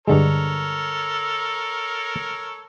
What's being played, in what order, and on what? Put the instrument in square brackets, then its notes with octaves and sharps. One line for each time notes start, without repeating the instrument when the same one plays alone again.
[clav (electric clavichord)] G2 D3 G#3 [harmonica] A4 A#4 C#5